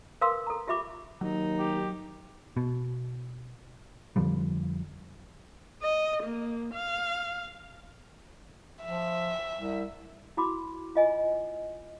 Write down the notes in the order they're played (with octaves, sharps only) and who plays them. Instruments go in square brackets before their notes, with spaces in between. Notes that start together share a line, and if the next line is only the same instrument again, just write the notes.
[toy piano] A#4 B4 F5 C6 D6 E6
A4 A#5
F4 G4 E5 B5 D6
[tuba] D#2 [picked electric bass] F#3 [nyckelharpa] D#4
[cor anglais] G4
[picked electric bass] B2
F2 D3 F3 G3
[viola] D#5
A#3
F5
[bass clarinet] F3 [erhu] E5
[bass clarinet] C2
[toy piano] E4 F#4 B5 D6
F4 D#5 G#5